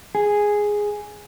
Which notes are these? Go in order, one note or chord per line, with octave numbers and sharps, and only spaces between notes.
G#4